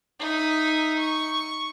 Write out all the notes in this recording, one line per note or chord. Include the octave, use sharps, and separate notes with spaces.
D#4 E5
C#6